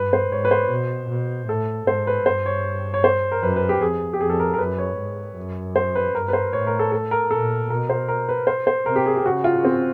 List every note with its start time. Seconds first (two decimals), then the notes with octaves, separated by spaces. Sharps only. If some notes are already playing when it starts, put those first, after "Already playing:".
Already playing: G2 B4
0.13 C5
0.32 G#2 C#5
0.45 B4
0.51 C5
0.70 B2
1.10 B2
1.49 A2 A4
1.87 G#2 C5
2.07 B4
2.26 G2 C5
2.46 C#5
2.94 C#5
3.04 C5
3.32 A#4
3.43 F#2 B4
3.56 B4
3.69 G4
3.81 F2 G#4
4.13 G4
4.20 F2 G#4
4.30 A4
4.40 A#4
4.54 A#4
4.58 F#2 B4
4.78 C#5
4.98 G#2
5.37 F#2
5.76 C5
5.95 B4
6.15 G2 A#4
6.28 B4
6.33 C5
6.53 A2 C#5
6.67 A#4
6.79 A4
6.92 A4
7.11 A#4
7.31 A#2 A4
7.70 B2 A#4
7.90 C5
8.08 A#4
8.29 B4
8.47 C5
8.67 C5
8.86 C3 A#4
8.96 G4
9.06 G#4
9.17 G4
9.25 C#3 F#4
9.44 F4
9.65 C4